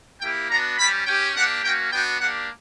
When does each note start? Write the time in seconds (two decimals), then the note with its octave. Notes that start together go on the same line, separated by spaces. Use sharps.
0.21 A#3 E4 G4 G5
0.49 B3 D4 F#4 A#5
0.78 G3 C#4 G4 B5
1.06 C#4 G4 G5
1.34 A#3 D4 G4 F#5
1.62 A#3 C#4 F#4 G5
1.91 B3 D4 F#4 G5
2.19 A#3 D4 G4 F#5